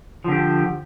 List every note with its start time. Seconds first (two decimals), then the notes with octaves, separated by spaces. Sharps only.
0.24 F3
0.28 D3
0.32 G4